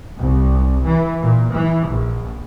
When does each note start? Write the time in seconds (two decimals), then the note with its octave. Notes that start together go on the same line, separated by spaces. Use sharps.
0.18 C2
0.84 E3
1.22 A#2
1.55 E3
1.88 A#1